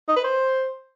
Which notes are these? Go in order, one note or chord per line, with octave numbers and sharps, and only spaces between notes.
D#4
B4
C5